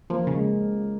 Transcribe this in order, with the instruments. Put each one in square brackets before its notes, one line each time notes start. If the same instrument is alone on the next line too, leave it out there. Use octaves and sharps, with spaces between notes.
[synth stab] F3 [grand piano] A#3
[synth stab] C#3
[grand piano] G#3